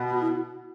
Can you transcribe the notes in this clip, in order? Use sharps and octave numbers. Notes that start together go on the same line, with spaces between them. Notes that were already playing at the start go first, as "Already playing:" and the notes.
Already playing: B2
F#4
E4